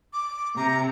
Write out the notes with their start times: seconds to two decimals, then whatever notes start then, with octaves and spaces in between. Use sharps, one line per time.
0.13 D6
0.56 C3 A#5